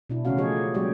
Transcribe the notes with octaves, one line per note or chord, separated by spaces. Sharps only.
B2 D4 E4
C#3 E3 A3 C#4 F#4 F5
F3 A3 D#4 G4 G#4 C#5
F#3 G#3 A#3 G4 C#5 D5